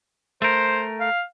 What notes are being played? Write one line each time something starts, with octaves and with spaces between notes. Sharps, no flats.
A3 A#4 C5
F5